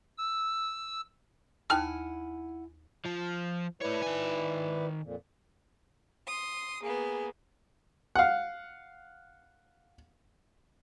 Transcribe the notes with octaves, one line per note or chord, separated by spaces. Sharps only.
E6
D#2 D#4 E4 F#5 G#5 A5 F6
F3
A2 E4 B4 C#5 D5
D#3 G#5
F2 A#2
C6 D#6
A#3 B3 G#4
F5 F#5